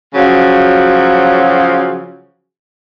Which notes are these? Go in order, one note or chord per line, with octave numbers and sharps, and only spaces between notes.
C#3 F3 F#3